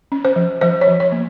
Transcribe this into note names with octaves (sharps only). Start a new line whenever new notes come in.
C#4
C5
F3
F3 C5
C#5
F3
C#5
A#3